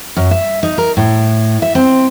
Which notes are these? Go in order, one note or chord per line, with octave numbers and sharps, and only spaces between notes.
F#2
E5
D#4
A#4
A2
E5
C4